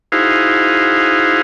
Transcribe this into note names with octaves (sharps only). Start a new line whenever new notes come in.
D#4 E4 F#4 G#4 C5 F5